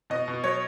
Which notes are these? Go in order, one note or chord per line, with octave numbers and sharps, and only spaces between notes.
B2 D#5
B2
F#3 C#5